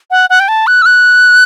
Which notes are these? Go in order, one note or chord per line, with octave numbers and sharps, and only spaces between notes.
F#5
F#5
G5
A5
F#6
E6
F#6